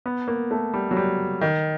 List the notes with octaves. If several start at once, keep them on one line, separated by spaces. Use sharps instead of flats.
B3
A#3
A3
G3
F#3
G3
D#3